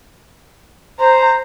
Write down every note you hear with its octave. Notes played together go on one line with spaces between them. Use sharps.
C5 A#5